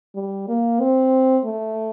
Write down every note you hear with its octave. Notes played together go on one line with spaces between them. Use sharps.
G3
A#3
C4
A3